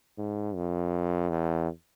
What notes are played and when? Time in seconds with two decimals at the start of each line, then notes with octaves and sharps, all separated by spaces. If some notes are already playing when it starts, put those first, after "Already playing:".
0.18 G#2
0.56 F2
1.30 E2